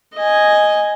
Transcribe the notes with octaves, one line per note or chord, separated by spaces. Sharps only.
D#5 G#5